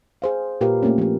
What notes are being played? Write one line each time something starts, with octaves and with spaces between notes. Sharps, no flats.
G#4 C5 F5
A#2 F4 G4 A#4 B4 F5
A3 A#3 C4 C#4
F3 G4